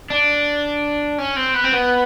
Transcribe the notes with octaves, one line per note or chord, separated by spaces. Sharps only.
D4
C#4
C4
B3
C4
B3